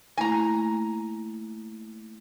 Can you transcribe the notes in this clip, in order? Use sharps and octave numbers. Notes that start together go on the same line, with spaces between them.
A3 A#3 E4 G#5 A#5